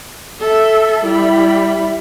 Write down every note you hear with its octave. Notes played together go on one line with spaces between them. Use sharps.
A4 E5
G3 E4 B5